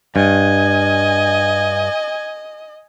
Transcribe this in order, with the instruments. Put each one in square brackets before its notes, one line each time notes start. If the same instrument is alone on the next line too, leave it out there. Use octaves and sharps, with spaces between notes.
[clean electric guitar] G2 [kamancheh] D#5 [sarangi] G#5